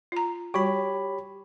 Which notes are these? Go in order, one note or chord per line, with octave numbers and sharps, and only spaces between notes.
F4 A#5
G3 F#4 G4 C#5 B5